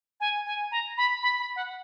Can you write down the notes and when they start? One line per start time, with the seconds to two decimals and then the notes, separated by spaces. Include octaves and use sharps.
0.20 G#5
0.46 G#5
0.71 A#5
0.97 B5
1.22 B5
1.39 B5
1.56 F#5